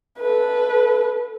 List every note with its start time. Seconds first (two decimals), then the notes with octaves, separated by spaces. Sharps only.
0.19 A4 B4